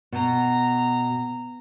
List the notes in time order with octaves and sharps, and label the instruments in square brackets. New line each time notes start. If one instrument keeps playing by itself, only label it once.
[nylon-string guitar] B2 [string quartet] A#5